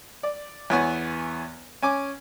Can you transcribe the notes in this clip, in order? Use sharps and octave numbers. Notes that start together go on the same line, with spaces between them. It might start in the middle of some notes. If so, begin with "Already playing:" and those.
D5
E2 E3 B3 C#5 F#5 G#5
C#4 G#5 D6